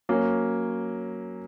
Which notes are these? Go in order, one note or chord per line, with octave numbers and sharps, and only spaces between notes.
F#3 A#3 C#4